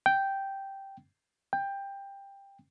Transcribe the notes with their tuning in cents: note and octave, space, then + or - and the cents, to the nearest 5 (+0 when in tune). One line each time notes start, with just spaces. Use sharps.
G5 -5
G5 +15